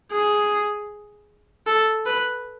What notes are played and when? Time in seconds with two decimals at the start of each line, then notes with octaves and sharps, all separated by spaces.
0.12 G#4
1.67 A4
2.06 B4